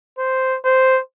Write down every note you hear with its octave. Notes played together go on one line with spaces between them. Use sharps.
C5
C5